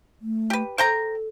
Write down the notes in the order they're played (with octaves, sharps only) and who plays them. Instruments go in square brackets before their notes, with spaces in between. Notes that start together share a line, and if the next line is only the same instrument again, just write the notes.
[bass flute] A3
[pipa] G4 B4
[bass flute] A4 [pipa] C5 G5 A#5